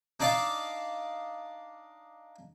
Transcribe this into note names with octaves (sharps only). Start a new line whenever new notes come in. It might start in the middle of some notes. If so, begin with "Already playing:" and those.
D4 D#4 D5 F5 A5